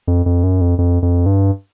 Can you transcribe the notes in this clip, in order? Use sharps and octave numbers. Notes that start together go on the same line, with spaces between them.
F2
F2
F#2
F2
F2
F2
G2